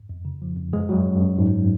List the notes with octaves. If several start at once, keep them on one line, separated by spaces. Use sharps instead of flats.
F2
C#3
F3
F2
F#2 G#3 G#4
F#3 F#4
F#2
F#2
G#2